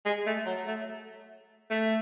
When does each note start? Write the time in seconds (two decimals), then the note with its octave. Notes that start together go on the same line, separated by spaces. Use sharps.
0.06 G#3
0.26 A3
0.46 F#3
0.67 A3
1.70 A3